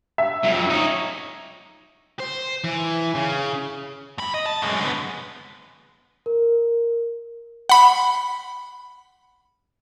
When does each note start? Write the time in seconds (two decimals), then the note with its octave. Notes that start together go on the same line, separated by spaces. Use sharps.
0.18 E5
0.43 F2 F#3
0.70 D#4 C#5
2.19 C5
2.64 E3
3.15 C#3
4.18 G2 B5
4.34 D#5
4.46 A5
4.62 F#2 G#3
4.80 D3 B3
6.26 A#4
7.69 F#5 B5